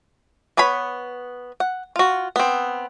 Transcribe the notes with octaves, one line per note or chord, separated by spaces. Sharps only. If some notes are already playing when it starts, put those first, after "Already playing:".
B3 B4 C#5 B5
F#5
F4 F#4
B3 C4